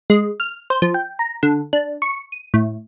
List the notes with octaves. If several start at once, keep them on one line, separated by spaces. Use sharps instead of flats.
G#3
F6
C5
F3
G5
A#5
D3
D4
C#6
D#7
A2